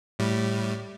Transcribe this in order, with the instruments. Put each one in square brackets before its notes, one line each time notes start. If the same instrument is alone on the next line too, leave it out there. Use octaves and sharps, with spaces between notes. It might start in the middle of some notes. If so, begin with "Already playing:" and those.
[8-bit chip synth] A2 G3